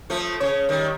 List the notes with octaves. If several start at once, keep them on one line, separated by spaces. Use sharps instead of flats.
F3 A3
C#3 C#5
D#3 G3